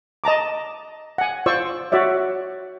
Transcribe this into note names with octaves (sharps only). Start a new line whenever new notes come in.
D#5 A5 A#5 D6
F#5 G#5
F4 C5 D5 C#6 E6
F#4 C#5 D5 E5